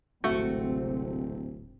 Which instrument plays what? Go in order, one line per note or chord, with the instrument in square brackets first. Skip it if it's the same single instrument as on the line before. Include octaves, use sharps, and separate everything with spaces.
[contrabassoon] D1 [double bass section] G#1 C3 C4 [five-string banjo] A3 F#4